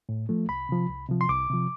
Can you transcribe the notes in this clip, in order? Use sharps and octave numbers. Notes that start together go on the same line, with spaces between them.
A2
F3 A3
C2 B5
C3 F3
C2
C3 F3
C6
C2 D6
C3 F3